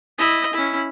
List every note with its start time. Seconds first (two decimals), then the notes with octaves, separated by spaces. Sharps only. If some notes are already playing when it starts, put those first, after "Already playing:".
0.18 E4 D#5
0.53 C#4 E4